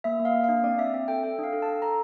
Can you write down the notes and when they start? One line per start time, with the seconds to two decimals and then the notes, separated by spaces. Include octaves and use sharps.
0.04 A#3 E5
0.20 A#3
0.25 F5
0.34 A#3
0.44 D4 F5
0.64 C4 D5
0.79 C4 E5
0.94 C4 E5
1.08 A4 G5
1.23 A4 G5
1.39 D4 F5
1.53 A4
1.62 A5
1.68 A4
1.82 A4 A#5